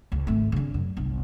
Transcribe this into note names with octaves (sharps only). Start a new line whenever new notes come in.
C#2
G#1 A3
C#3 D4
F#2
G1 C2